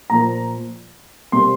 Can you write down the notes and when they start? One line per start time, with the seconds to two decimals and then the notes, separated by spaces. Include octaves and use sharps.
0.10 A#2 F3 A#3 A#5
1.32 C3 G3 A#3 C6